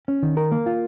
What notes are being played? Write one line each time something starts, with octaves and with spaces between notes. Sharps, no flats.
C#4
D#3
A#4
A#3
F4